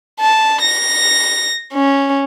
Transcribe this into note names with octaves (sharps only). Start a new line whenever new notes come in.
A5
A#6
C#4